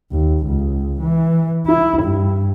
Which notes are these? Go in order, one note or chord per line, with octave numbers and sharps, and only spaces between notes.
D#2
C#2
E3
E4
G2